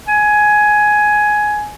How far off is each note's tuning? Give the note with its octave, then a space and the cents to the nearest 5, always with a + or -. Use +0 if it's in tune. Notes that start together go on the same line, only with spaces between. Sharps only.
G#5 +15